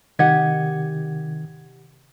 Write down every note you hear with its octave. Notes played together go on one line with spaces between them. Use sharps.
C3 D#3 G4 D#5 F#5 G#6